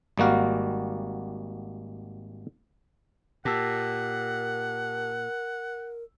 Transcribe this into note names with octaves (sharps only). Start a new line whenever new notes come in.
G#1 G3 A#3 F#4 F5
A#2 G4 A#4 F#5 A5 E6